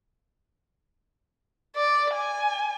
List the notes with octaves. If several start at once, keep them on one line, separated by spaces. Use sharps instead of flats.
D5
G#5